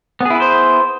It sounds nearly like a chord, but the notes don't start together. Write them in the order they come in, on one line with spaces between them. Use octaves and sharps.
B3 G#4 E4 B4 C5